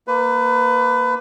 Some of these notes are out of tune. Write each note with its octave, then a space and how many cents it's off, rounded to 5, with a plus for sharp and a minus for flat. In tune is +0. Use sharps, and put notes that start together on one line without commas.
A#3 +0 B4 +25